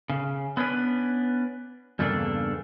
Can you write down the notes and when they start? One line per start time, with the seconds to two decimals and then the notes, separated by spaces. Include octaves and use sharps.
0.10 C#3
0.57 B3 C#4 D4 B4
1.99 E2 G2 C#3 A3 A#3 D4